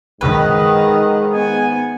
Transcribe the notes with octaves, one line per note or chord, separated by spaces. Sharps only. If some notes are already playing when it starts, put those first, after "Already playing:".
G#2 D#3 B4
B3 G#5